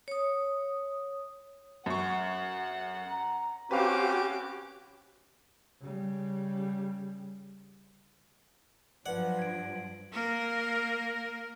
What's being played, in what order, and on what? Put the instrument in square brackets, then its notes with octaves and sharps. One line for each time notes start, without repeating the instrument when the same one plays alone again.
[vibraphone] C#5 D#6
[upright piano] F#2 C#6 [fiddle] F#5
[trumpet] A#5
[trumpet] C4 [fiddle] C#4 D6 [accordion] F#4 G4 [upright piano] B4 F5
[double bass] C#3 G3
[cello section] G2 F3 F#3 [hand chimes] B4 D5 [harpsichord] F#5
[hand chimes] G#6 D7
[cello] A#3 A#4